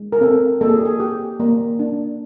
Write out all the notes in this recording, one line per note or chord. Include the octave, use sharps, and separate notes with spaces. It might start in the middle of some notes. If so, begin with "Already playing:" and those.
Already playing: G#3
A#4
C4 A4
A#3 A4
G#4
G4
G#4
G4
A#3
D4